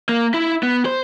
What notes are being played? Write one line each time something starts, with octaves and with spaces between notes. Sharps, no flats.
A#3
E4
B3
C5